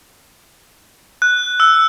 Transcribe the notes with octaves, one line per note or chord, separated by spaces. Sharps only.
F#6
E6